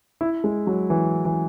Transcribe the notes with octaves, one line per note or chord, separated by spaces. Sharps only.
E4
G#3
F#3
E3
E3